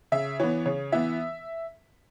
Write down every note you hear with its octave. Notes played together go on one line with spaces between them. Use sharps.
C#3 E5
E3 B3 C#5
C#3 C#5
E3 B3 E5